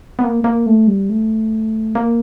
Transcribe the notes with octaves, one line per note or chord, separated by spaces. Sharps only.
B3
A#3
A#3
A3
G3
A3
A#3